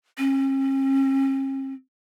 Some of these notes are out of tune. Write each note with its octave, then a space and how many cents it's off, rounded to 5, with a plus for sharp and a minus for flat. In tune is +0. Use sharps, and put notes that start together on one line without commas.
C#4 -45